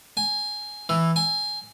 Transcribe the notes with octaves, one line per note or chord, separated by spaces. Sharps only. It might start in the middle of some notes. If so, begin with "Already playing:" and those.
G#5
E3
G#5